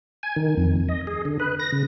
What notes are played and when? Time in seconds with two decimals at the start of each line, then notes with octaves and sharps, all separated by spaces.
0.23 G#5
0.36 D#3
0.57 F2
0.75 F2
0.89 D#5
1.07 G#4
1.25 D3
1.40 B4
1.60 A#6
1.72 C#3